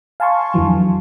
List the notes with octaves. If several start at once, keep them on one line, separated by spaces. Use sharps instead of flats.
F5 G#5 A5 C6 C#6
F2 D3 E3 F#3